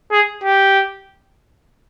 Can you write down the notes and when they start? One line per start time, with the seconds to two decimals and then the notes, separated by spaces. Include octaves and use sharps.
0.11 G#4
0.43 G4